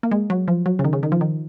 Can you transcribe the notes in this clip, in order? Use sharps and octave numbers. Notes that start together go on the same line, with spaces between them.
A#3
G#3
F#3
F3
F#3
C#3
D#3
C#3
D#3
F3
D#3